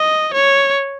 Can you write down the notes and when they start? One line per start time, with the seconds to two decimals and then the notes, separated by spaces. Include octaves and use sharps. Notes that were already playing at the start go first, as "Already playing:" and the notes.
Already playing: D#5
0.34 C#5